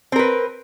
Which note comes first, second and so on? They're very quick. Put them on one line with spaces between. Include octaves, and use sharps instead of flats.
C4 A#4 B4